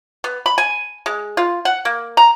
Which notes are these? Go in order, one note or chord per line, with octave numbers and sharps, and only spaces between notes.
B3
B5
G#5
G#3
F4
F#5
A#3
A#5